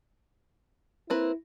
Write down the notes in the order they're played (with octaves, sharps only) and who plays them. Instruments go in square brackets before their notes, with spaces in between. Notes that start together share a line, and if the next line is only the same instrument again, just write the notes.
[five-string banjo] A#3 C4 B4 [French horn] E4